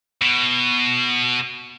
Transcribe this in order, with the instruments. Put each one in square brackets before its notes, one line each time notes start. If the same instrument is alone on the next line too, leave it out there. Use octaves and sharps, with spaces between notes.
[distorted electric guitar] B2